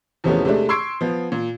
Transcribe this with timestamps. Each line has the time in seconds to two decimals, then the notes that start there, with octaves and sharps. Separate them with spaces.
0.24 E2 C3 F3 A3 B3 C#4
0.45 C3 G#3 A3 D4
0.69 C6 C#6 E6 G#6 C7 D7
1.01 F3 B3
1.32 A#2